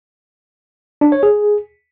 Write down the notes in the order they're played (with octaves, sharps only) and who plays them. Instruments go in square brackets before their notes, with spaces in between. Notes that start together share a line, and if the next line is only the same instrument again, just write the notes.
[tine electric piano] D4
C#5
G#4